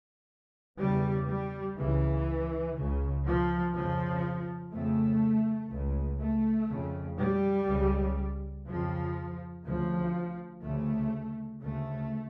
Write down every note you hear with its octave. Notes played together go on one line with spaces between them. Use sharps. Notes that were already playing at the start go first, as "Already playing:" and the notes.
E2 C#3 G3
G3
C#2 C#3 E3
C#2 C#3
F3
F2 C#3 F3
F2 C#3 A3
C#2 C#3
A3
F2 C#3
G3
C#2 C#3
F2 C#3 F3
D2 C#3 F3
D2 C#3 A3
D2 C#3 A3